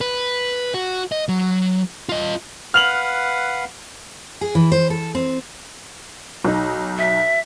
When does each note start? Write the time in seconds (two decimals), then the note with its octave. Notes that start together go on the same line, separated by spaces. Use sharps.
0.01 B4
0.74 F#4
1.12 D#5
1.28 F#3
2.09 F4 D#5
2.74 B4 F5 F#5 F6 F7 F#7
4.41 G#4
4.55 E3
4.72 C5
4.90 A4
5.15 C4
6.44 B1 D#4
6.98 E5